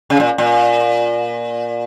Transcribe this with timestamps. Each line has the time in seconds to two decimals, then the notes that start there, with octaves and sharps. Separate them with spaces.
0.10 C#3
0.20 A#2
0.38 A#2